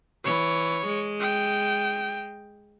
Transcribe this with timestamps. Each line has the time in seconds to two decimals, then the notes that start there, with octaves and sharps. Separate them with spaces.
0.25 E3 C#5
0.86 G#3
1.20 G5